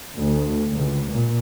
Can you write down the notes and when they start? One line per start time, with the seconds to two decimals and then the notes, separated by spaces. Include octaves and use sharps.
0.18 D2
0.71 C#2
1.08 A#2